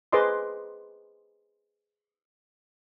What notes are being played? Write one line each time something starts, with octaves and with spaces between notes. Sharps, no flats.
G#4 B4 C5 D#5 C6 D6